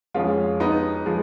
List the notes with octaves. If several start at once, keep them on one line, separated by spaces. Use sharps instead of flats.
F2 F3 G#3 C#4 F4
B3 D#4
F3 G#3